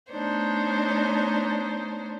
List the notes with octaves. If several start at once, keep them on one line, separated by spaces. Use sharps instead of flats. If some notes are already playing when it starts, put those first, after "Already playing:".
A3 B3 D4 D#4 C5 C#5